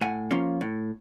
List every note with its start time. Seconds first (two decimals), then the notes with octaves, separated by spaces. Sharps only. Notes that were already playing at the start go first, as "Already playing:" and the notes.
0.01 A2 F#5 G#5
0.31 F3 A#3 C#4 F4
0.61 A2